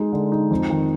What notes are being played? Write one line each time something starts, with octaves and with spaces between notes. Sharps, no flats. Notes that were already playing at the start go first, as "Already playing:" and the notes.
Already playing: G#3 D#4
D3
D#4
F2
D#3